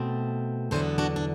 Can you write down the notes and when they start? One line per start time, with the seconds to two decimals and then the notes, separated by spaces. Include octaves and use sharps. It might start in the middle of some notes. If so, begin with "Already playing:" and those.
Already playing: B2 A3 C4
0.71 E2 D3 F#3 B3 A4 C5
0.98 D4 F#4
1.16 D4